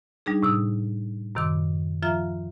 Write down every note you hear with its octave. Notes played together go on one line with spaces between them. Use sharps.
G3 D4 D#4 G#4
A2 C3 D#6
F#2 C3 D#3 C6 D6
F3 F4 E5 F5 A#5